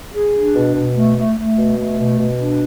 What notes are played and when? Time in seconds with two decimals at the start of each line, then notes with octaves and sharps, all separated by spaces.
0.14 G#4
0.35 D4
0.56 B2
0.75 B2
0.96 A3
1.17 A3
1.37 A3
1.57 B2
1.77 A3
1.99 B2
2.19 B2
2.39 D4